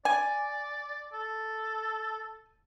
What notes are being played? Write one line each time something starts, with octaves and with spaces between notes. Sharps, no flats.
D5 G#5
A4